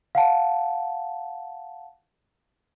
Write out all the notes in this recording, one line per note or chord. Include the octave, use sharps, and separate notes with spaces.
F5 F#5 A5